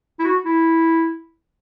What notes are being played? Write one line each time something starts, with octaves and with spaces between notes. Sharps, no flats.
E4
F#4
E4